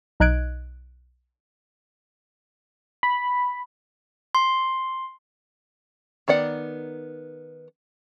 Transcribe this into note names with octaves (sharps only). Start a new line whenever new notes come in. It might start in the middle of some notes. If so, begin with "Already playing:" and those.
B1 D#4 D#5 F#6 G#6 D7
B5
C6
D#3 B3 D5 F#5